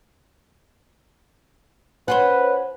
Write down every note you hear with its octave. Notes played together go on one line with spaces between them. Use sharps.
C#4 F4 B4 C5 F#5